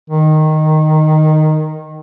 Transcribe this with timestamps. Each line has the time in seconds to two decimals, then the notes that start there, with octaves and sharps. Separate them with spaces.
0.10 D#3